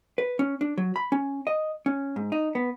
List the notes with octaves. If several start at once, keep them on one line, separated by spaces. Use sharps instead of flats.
B4
C#4
D4
F#3
B5
C#4
D#5
C#4
G#2
D#4
B3